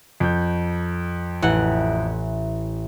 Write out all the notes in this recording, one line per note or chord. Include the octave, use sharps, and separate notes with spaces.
F2 G6
A1 E3 F#5